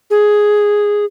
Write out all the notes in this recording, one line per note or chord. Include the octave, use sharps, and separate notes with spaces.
G#4